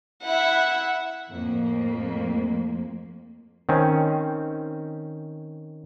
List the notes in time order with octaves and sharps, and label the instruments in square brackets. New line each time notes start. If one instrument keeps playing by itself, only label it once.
[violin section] E4 E5 E6 [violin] F#5
[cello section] F2 A2 A#3
[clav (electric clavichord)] D#3 C4 C#4